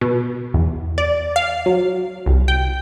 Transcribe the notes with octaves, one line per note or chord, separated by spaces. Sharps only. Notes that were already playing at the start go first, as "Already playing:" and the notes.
B2
E2
D5
F5
F#3
C2
G5